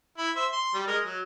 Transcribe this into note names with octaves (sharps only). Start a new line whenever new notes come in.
E4 B5
C5 E5
C6
G3
G#3 A#4 D#5
F#3